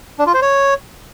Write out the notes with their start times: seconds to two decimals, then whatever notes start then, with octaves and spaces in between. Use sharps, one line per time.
0.19 D4
0.27 F4
0.34 C5
0.42 C#5